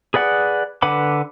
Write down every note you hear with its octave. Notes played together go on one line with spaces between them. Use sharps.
G#4 B4 D5 F#5
D3 B4 F#5 B5 D6